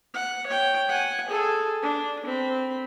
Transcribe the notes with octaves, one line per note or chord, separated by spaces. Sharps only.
F#5
C#5 G5
F#5 G#5
G#4 A4
D4
C4 B5